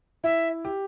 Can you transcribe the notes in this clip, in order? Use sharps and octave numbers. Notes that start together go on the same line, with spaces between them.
E4 E5
G4